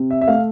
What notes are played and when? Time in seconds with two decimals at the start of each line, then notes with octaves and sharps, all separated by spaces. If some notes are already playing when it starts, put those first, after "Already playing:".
Already playing: C3
0.11 E5
0.21 E5
0.28 A3 F5